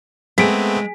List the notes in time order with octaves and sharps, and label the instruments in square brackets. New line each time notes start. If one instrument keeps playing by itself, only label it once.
[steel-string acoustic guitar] G#3 [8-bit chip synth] A3 B3 C4 [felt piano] B6 D7